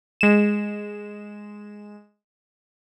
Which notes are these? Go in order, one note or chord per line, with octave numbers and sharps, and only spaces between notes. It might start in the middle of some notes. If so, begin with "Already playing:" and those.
G#3 E7